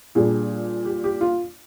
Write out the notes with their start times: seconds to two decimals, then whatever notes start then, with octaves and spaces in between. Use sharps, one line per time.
0.15 A#2 G3 D4 G#4
0.85 G4
1.04 G4
1.21 F4